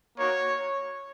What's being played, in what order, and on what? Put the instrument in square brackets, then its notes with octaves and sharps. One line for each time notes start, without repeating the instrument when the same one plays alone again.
[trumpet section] A#3 D#4 F#4 C#5